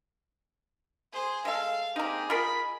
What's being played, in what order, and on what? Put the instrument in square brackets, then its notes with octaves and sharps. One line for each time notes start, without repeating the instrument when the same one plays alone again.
[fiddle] G#4 C5
[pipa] G#3 A4 [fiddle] F5
[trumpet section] A#3 C4 G4 [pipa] D#4 A#5 [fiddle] G#4
[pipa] F4 A#4 [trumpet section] D#5 B5